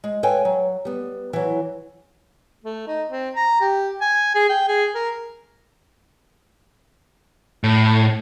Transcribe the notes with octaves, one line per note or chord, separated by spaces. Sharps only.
G#3
A4 B4 C#5 F5 G5 G#5
F#3
G3 B3
E3 F#3
A3
D#4
C4
A#5
G4
G#5
G#4
G5
G#4
A#4
A2